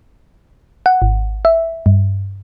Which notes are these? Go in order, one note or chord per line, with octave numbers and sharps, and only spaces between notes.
F#5
G#1
E5
G2